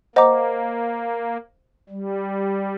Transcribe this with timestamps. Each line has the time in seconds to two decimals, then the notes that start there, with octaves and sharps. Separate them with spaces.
0.15 A#3 C5 D#5 F#5 A#5 D6
1.89 G3